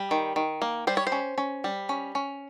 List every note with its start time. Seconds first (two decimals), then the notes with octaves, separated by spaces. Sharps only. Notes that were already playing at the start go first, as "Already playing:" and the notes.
Already playing: G3
0.11 D#3
0.36 D#3
0.62 A#3
0.87 G3 C5
0.97 C#5
1.07 C5
1.12 C#4
1.38 C#4
1.64 G3
1.89 C#4
2.15 C#4